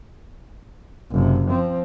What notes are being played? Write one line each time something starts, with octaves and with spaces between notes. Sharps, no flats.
F#1 C3
F3 C4